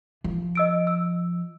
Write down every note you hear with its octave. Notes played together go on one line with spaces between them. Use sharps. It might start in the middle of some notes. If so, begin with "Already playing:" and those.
F3
D#5 E6 D7
E6